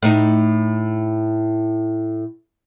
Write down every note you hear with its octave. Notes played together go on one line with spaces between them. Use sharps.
A2 D#4